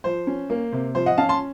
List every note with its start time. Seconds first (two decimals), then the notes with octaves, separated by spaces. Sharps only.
0.04 F3 C5
0.27 C#4
0.50 A#3
0.73 C3
0.95 F3 C5
1.06 D#5 F#5
1.18 C#4 F5 A5
1.29 A5 C6